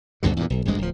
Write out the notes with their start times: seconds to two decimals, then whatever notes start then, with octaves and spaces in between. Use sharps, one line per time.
0.23 D2 G2 B2 D3
0.37 E2 G2 A#2
0.50 B1
0.65 G#1 D2 G2 G#3
0.78 D1 F3